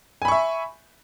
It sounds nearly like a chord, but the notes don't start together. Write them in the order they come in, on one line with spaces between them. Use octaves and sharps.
G#5 B5 C#6 E5